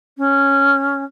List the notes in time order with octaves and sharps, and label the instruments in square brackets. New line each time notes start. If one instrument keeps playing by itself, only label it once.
[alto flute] C#4